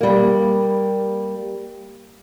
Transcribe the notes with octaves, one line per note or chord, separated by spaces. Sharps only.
G3 A#3